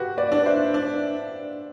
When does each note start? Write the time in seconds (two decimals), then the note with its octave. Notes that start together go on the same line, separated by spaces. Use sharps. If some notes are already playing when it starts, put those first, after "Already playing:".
Already playing: F#4 G4 B4
0.17 B4 D5
0.32 D4
0.46 C5 E5
0.74 D4